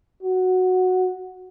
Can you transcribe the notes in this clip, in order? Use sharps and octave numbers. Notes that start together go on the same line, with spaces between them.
F#4